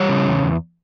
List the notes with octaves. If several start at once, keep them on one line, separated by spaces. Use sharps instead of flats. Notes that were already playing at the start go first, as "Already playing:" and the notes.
Already playing: G3 C#5
C#3
E2
E2